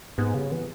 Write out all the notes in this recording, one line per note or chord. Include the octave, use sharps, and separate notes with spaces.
G#2 B3
C#3 G3
E3 B3